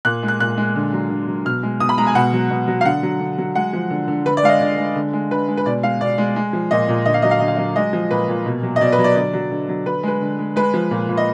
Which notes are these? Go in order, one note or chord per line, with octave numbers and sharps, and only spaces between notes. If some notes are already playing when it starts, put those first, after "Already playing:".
A#2 F#6
G#3
F#6
A#2 F#6
G#3
D3
F#3
D3
F#3
B2 F6
G#3
B2 D#6
B5
G#3 A#5
G#5
B2 F#5
F#3
B2
F#3
F5
D3 F#5
F#3
D3
F#3
G#3 F#5
F3
D3
D3
D3 B4
D5
G#3 F5
D#5
D3 D5
G#3
D3
G#3
D3 B4
G#3
B4
B2 D5
G#3 F5
B2 D5
G#3
G#3
F3
A#2 D#5
A#2
D3 D#5
F5
F#3 D#5
F5
D3 D#5
F5
F#3 D#5
G#3 D#5
F3
A#2 B4
A#2
B2
F#3
D#5
B2 D5
B4
F#3
D5
D3 D5
F#3
D3
F#3
D3 B4
G#3 B4
D3
G#3
G#3 B4
F3
A#2
A#2
D#5